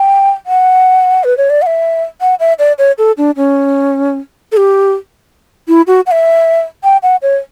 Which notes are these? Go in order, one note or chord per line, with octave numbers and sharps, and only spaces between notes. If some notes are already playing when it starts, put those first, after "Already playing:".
Already playing: G5
F#5
B4
C#5
D5
F#5
E5
F#5
E5
D5
C#5
A4
D4
C#4
A4
G4
E4
F#4
F#5
E5
G5
F#5
C#5